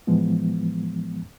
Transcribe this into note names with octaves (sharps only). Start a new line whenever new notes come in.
A2 E3 F3 G#3 B3